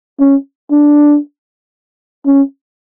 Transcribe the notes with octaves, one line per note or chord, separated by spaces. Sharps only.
C#4
D4
C#4